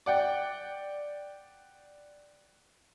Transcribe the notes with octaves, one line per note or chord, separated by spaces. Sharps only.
D5 F#5 G5